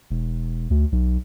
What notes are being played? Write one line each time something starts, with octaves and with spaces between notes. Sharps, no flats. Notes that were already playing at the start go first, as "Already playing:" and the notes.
E1
D2
B1